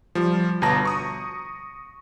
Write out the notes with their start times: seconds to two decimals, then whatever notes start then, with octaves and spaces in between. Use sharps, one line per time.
0.15 F3 G3
0.62 G1 B2 A5 A#5 A#6
0.85 C#6 D#6